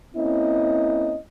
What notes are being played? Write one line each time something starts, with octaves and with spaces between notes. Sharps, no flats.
A#3 C4 C#4 E4 D#5